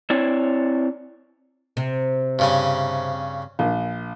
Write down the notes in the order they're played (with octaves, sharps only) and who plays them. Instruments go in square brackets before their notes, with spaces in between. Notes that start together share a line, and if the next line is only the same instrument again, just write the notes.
[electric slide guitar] C4 E4 C#5 D5
[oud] C3
[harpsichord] G2 C#3 C#4
[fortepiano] A#1